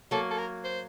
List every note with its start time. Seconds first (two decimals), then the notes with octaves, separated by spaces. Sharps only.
0.11 F#3 A#3 A4
0.31 A4
0.38 A#4
0.65 C5